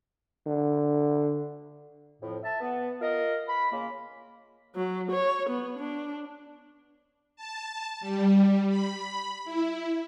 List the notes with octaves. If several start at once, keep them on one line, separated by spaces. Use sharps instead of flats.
D3
F2 A2 F3
E5 A5
B3
F4 A#4 D#5
B5
C#3 A#3 F4
F#3
C#5
B3
D4
A5
G3
B5
E4